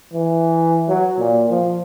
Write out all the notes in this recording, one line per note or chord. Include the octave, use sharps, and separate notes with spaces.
E3
F#3
A#2
F3